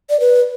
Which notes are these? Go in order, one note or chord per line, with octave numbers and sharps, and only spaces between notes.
D5
B4